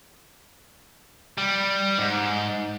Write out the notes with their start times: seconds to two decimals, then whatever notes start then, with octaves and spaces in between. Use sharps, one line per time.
1.38 G3
1.98 G#2